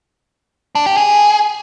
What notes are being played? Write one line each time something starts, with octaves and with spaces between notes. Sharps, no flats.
D4
G4
G#4